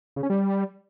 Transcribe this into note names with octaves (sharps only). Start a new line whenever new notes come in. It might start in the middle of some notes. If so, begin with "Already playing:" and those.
C#3
C#4
G3